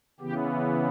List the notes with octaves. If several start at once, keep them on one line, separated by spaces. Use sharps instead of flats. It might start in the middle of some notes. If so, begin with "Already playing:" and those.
C#3 E3 B3 G4